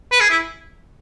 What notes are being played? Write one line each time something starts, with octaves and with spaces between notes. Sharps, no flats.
B4
G#4
E4